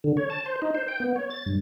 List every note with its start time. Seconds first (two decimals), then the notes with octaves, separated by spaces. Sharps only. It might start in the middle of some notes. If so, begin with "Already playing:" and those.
0.04 D3
0.17 C#5
0.30 A5
0.46 C5
0.62 D#4
0.75 C5
0.88 G5
1.00 B3
1.16 C#5
1.30 A6
1.46 G2